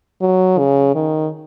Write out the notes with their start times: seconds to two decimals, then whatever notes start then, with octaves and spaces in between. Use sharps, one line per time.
0.21 F#3
0.59 C#3
0.95 D#3